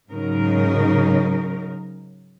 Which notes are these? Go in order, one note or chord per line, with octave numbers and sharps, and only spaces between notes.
G#2 C#3 F#3 D#4 A#4